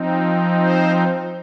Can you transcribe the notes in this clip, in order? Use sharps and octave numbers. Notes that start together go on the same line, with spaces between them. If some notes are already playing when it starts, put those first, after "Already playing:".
Already playing: F3 C4 D#4
C5